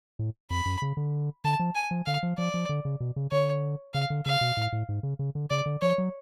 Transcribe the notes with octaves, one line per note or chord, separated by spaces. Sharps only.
A2
F2 B5
F#2
C#3
D3
D3 A5
F3
G#5
F3
D3 F5
F3
F3 D5
F3
D3
C#3
B2
C#3
D3 C#5
C#3 F5
D3
C#3 F5
B2
A2
A2
G#2
C#3
C#3
D3
C#3 D5
D3
F3 C#5
F#3